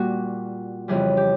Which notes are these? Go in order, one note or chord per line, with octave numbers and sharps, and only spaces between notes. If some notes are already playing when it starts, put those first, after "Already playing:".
Already playing: A#2 G3 A#3 F#4
F2 C#3 E3 G3 G#4
G4